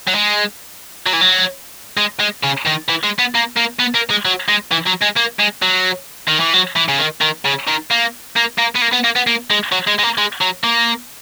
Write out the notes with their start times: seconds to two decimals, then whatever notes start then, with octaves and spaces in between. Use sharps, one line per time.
0.08 F#3
0.15 G#3
1.06 F#3
1.13 E3
1.21 F#3
1.97 G#3
2.20 G#3
2.43 C#3
2.65 D#3
2.89 E3
3.03 G#3
3.19 B3
3.35 A#3
3.57 A#3
3.80 B3
3.95 A#3
4.10 G#3
4.25 F#3
4.49 G#3
4.72 E3
4.87 F#3
5.02 G#3
5.17 A#3
5.40 G#3
5.62 F#3
6.28 D#3
6.40 E3
6.53 F#3
6.76 E3
6.88 C#3
6.99 D#3
7.21 D#3
7.45 C#3
7.68 D#3
7.91 A#3
8.37 A#3
8.58 A#3
8.76 B3
8.82 A#3
8.93 B3
9.04 A#3
9.16 B3
9.27 A#3
9.51 G#3
9.72 F#3
9.87 G#3
9.99 G#3
10.03 A#3
10.18 G#3
10.41 F#3
10.64 A#3